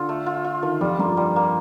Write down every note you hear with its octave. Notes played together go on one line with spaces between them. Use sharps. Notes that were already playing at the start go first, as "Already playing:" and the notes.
Already playing: D3 F4 A4
A3
F4
F4
D#3 A3
F2 G3
G2 A#3
G3
A#3